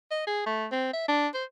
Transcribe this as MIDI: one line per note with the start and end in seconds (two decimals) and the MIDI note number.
0.11 0.22 75
0.27 0.45 68
0.46 0.67 57
0.72 0.89 60
0.93 1.07 76
1.08 1.28 62
1.34 1.44 72